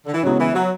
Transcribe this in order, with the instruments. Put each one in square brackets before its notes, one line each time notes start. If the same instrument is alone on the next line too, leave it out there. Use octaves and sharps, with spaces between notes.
[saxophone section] D3
E3
[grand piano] C#3 G#3 B3 E4 [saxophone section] F#3
[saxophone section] E3
F#3